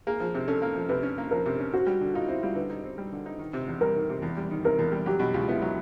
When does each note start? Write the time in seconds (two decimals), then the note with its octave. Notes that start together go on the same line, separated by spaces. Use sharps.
0.07 A#3 G#4
0.20 F3
0.35 C3
0.47 C#4 A4
0.62 A#3
0.75 F3
0.89 C3 B4
1.03 C#4
1.18 A#3
1.31 F3 A#4
1.46 C3
1.60 C#4
1.72 C4 F#4
1.86 G3
2.01 D3
2.14 D#4 F4
2.28 C4 E4
2.43 G3 F4
2.56 D3 B4
2.70 D#4
2.84 C4
2.98 G3
3.12 D3
3.26 D#4
3.39 D#3
3.53 C3
3.68 E2
3.81 G3 A#4
3.96 D#3
4.10 C3
4.22 E2
4.37 G3
4.51 D#3
4.64 C3 A#4
4.79 E2
4.92 G3
5.06 F#3 G4
5.19 B2
5.34 C#2 F4
5.48 B3 E4
5.62 F#3